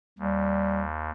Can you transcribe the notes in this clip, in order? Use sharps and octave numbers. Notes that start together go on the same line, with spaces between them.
D#2 G3